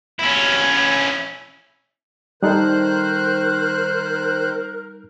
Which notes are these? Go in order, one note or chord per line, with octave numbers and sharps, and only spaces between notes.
C#4 E4
D#3 G3 D#4 A4 A#4 C5 F#6